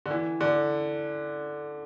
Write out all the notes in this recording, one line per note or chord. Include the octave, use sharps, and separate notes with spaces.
D3
E3
D3